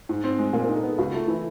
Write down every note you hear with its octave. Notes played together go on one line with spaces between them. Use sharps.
G#2
C4
G#3
A#2 A#4
A#4
D#4
A4
B3 G#4
C#2 F#4
A3 F4
E3 E4